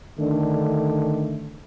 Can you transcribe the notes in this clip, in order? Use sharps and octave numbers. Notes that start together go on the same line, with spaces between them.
D3 D#3 A3 D4